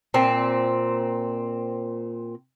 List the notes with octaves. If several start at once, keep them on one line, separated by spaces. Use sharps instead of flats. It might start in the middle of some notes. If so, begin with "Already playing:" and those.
A#2 C4